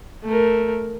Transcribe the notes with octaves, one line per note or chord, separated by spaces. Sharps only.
A3 A#4